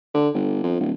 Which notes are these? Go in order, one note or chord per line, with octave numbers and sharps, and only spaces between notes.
D3
G1
F2
D1